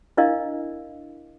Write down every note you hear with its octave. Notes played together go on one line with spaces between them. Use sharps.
D4 E4 A#4 D#5 F5